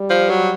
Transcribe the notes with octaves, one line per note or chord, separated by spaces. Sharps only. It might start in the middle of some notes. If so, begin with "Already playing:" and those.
Already playing: G3
F3
F#3